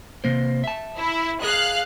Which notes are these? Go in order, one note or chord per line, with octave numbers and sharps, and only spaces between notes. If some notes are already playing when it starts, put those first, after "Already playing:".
C3 A#3 C5
E5 A5
E4
G#4 A#4 D#5 F5 F#6